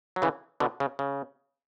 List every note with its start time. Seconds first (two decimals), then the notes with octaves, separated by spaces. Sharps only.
0.16 F#3
0.22 C#3 E3
0.60 B2 D3
0.80 C#3
0.99 C#3